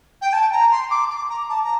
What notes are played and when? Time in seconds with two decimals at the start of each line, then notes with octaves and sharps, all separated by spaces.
0.21 G5
0.32 A5
0.52 A#5
0.70 C6
0.90 D6
1.10 D6
1.29 A#5
1.49 A5
1.63 A#5